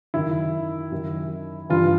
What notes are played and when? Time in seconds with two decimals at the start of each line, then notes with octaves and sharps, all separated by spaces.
0.14 F#2 D#3 E4
0.92 F#2 D#3
1.70 G2 E3 F4